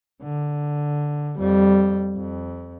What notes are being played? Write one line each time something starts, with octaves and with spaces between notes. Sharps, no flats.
D3
F2 G3
F2